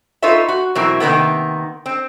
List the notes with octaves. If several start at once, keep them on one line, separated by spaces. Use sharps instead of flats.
D#4 F4 A4 B4 C#5 E5
F#4
B2 E3 F#3 C4 E4 A#4
C3 D#3 G#3 A#3 B3
C4